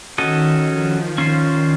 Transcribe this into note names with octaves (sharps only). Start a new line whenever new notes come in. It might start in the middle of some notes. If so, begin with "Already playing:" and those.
D#3 C#4 F#4 A4 D#5
F3
D#3 C#4 F4 C5